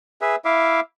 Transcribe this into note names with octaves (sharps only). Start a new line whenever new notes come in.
G#4 B4 E5
E4 E5 F5 D6